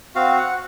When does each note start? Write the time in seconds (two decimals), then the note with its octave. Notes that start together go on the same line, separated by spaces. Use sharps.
0.15 C4 F#4 F5
0.38 F#5